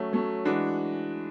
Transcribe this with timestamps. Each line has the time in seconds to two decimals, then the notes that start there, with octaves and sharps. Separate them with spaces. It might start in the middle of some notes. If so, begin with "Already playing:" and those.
Already playing: F#3 A3 C#4
0.13 F#3 A3 C#4
0.45 E3 G#3 D4 F#4